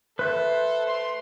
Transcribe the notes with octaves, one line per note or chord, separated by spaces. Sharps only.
A4 B4 C5 E5 F#6
A3 C6